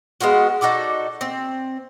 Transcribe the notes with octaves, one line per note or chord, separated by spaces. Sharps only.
G#3 B3 F4 F#4
D#4 F#4 A4 D5
C4